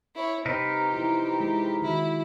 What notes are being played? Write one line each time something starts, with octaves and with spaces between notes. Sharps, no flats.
E4 C#5
C3 C4 D#4 G4 A#4 B4
E4 F4
G#3 E4
D#3 E4 F#4